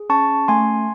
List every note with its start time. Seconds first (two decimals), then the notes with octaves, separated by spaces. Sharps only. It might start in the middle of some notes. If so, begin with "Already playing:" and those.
Already playing: G#4
0.09 C#4 A5 C#6
0.48 A3 G#5 C6